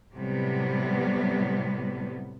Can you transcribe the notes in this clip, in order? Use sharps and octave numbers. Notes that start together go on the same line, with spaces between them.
A2 C3 F#3 G3 B3